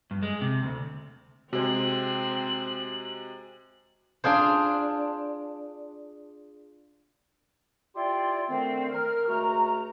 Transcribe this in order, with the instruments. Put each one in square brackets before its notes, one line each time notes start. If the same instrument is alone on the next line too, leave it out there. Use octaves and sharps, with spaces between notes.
[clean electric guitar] G2
G#3
C3
D2
[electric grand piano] C3 G#3 [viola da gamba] C4 [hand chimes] F#4 C5 [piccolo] F#7
[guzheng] D4 F4 G#4 C5
[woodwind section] E4 F4 G4 D5 G5 C6
D3 D#3 A3 C4
A#4 F6
C#2 A3 F#4 A#5